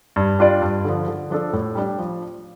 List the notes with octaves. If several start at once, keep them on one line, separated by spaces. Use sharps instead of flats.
G2
G3 D4 F4 D5
G2
D3 F3
D3
F3 D4 A4
A2
G3 D4
F3